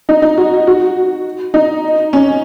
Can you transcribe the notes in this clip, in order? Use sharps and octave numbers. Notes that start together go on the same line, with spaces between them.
D#4
D#4
F#4
F#4
D#4
C#4